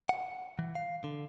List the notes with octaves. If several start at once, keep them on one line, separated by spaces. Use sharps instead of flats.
F#5
E3
F5
D3